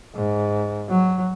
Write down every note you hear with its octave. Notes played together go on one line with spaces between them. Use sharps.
G#2
F#3